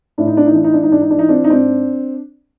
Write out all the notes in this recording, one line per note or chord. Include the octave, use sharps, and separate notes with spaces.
A2 D4
D#4
D4
D#4
E3 D4
D#4
D4
G#2 D#4
D4
D#4
D4
E3 D#4
C4 D4
D#4
G#2 C4 D4